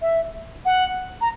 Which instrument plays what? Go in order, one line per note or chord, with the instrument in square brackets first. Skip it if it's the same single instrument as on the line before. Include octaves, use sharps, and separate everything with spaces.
[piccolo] E5
F#5
A#5